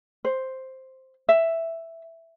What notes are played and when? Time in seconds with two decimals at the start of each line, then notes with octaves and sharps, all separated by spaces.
0.25 C5
1.29 E5